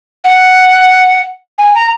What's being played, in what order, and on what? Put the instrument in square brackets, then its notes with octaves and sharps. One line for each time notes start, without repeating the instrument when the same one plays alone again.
[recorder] F#5
G#5
A#5